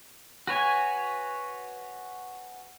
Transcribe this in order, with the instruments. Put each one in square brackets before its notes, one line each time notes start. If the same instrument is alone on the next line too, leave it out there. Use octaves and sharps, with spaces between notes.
[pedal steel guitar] F#4 B4 C#5 G#5